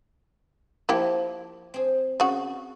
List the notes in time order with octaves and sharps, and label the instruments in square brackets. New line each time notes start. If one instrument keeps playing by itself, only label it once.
[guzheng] F3 [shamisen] A#3 E4 G4
[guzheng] C4 G#4
[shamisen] C#3 F#4